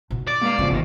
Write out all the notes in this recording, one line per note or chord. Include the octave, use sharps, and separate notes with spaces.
B2 D#4
D5
G#3 A#3 B4 F5
G1 C#3 F3 A#3 C#4
G#1 C3 D#3 C#4 D#5